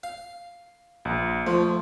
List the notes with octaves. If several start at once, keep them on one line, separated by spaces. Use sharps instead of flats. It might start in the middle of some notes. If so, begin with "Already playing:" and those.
F5
A#1
F3 A3